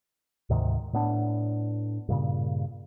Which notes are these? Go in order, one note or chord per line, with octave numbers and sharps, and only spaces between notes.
D2 G#2 C3 D#3
A2 B3 D4
G2 A#2 C#3